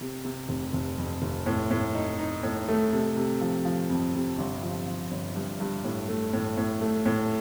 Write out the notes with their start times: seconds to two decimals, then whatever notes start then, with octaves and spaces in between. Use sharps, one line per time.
0.01 C3
0.25 C3
0.49 F1
0.73 F1
0.98 F2
1.22 F1
1.46 A2
1.71 A2
1.95 D#4
2.19 D#4
2.43 A2
2.69 A3
2.93 C3
3.17 C3
3.41 F3
3.65 F3
3.90 F2
4.14 C3
4.38 G1
4.63 F3
4.87 F3
5.11 G1
5.36 G2
5.60 G2
5.84 A2
6.09 A3
6.33 A2
6.57 A2
6.81 A3
7.06 A2